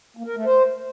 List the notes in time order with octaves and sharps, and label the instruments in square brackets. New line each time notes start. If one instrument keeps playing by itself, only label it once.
[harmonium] A#3
A#4
A3
C5